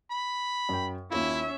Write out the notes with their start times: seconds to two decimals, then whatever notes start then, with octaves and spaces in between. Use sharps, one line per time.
0.11 B5
0.69 F#2 G5
1.11 D#2 C#4 E4 F4 E5